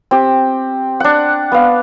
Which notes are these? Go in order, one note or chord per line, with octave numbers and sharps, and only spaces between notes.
C4 G4
D4 F#5
B3 F5